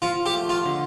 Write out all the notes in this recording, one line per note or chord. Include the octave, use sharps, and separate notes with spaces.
F3 F4
G4
A3
F4
D3